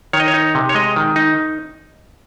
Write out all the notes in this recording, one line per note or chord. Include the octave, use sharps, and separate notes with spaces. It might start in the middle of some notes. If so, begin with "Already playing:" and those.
D#3 C#5
D#5
C#5
D#4
C3
C#5
G#3 D#5
D#3
D#4